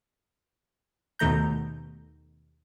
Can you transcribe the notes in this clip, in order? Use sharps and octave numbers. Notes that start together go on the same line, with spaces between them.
D#2 B2 D#3 A3 A#5 G6